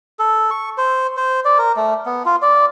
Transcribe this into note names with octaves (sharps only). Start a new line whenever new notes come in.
A4
C#6
C5
C5
D5
A#4
A3
B3
F4
D5